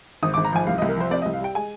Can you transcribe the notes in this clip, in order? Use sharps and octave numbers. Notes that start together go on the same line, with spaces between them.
G#1 D#6
D6
G#1
A#5
F3 G#5
C2 F5
D#5
C2
A#4
F3 C5
C4 D5
D#5
C2
F5
G3 G5
G#3 G#5